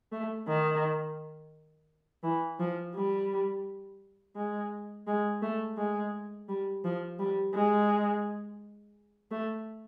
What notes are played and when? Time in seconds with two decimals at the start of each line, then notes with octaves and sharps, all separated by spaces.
0.12 A3
0.47 D#3
2.23 E3
2.60 F3
2.95 G3
4.36 G#3
5.07 G#3
5.42 A3
5.77 G#3
6.49 G3
6.84 F3
7.19 G3
7.54 G#3
9.31 A3